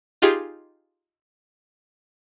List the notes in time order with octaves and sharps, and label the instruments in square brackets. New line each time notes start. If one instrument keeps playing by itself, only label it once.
[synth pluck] D#4 F4 G4 G#4